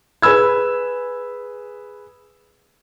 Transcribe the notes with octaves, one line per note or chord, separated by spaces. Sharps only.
G#4 B4 G#5 B5 E6 G#6